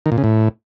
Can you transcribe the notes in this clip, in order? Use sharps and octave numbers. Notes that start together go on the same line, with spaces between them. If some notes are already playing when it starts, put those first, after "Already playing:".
D#3
A#2
C#3
A2